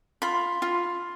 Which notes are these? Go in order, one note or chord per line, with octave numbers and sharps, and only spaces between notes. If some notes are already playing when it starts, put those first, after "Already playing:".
F4 B5
F4